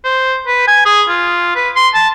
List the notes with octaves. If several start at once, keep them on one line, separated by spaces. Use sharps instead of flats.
C5
B4
G#5
G#4
F4
B4
C6
A5